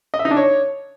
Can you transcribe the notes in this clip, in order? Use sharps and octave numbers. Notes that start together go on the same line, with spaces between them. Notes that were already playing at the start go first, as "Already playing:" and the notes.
D#5
E5
D#4
D4
C#5